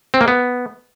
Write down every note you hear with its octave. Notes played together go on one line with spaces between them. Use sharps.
C4
A#3
B3